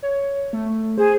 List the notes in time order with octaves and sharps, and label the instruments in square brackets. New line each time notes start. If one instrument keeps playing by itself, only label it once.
[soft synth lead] C#5
A3
[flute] G#4 [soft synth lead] C5